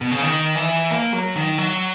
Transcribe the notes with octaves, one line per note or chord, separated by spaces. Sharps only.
B2
C#3
D#3
E3
A#3
F#3
D#3
F#3